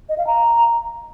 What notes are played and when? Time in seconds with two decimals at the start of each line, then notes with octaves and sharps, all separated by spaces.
0.09 D#5
0.18 F5
0.27 A#5